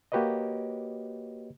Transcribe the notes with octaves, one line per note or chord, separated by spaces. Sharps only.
A#3 F#4 G4 B4 C#5 D#5